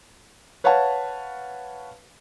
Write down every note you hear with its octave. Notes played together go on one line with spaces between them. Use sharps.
B4 C#5 F5 F#5 A5